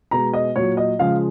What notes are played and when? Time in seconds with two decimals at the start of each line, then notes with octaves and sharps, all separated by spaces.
0.11 B2 G#3 A#5
0.33 D#5
0.56 A#2 F#3 C#5
0.77 D#5
0.99 C#3 F3 G#3 F5